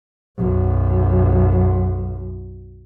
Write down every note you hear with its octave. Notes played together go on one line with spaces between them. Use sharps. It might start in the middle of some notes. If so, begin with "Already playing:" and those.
B1 F#2